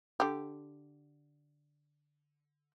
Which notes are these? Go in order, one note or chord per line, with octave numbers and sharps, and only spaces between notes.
D3 G4